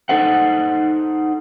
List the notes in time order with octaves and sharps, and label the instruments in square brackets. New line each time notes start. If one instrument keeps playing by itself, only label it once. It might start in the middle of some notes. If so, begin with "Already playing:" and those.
[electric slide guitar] D#4 A4 C5 F#5